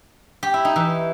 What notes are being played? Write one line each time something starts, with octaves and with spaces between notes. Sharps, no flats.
G4
E4
D#4
E3